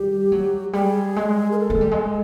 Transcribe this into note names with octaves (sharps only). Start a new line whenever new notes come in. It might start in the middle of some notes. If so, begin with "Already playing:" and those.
Already playing: G3 G4
F#3
G3 G#4
G#3
A#4
A4
G#3
G3
G#3